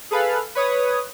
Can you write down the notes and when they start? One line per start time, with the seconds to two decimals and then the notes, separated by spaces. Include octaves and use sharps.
0.11 G#4 A4 B4 F5
0.55 B4 C#5 D#6